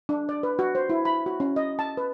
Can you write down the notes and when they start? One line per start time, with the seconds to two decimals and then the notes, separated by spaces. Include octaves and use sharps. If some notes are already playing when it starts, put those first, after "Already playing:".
0.09 D4
0.29 D5
0.43 B4
0.59 F#4
0.75 C5
0.90 E4
1.05 B5
1.26 F#4
1.40 C#4
1.56 D#5
1.79 A5
1.97 B4